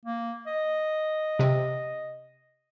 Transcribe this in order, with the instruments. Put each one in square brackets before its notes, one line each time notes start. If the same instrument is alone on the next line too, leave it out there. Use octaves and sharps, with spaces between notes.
[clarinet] A#3
D#5
[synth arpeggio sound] C3 C4